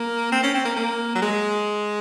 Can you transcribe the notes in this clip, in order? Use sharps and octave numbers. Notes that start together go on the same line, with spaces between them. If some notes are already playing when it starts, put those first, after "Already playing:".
Already playing: A#3
C4
C#4
C4
A#3
A#3
F#3
G#3